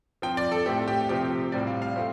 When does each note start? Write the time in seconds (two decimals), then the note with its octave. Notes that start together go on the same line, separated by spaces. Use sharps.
0.22 F3 C4 G5
0.37 D5
0.52 A4
0.66 A2 A3 C4 G4
0.88 G4
1.09 C3 F3 C4 G4
1.52 A2 G3 C4 D5
1.67 F5
1.82 F5
1.96 F3 A3 C4